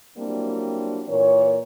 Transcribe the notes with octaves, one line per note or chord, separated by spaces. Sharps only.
F#3 G3 A#3 C4 D4 E4
A#2 E3 A#4 C#5